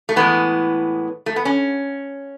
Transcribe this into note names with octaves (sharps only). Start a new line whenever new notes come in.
A3
A2 E3 G#3 B3
A3
B3
C#4